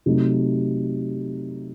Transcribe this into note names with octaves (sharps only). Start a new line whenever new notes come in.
C3 F#3 A3 D#4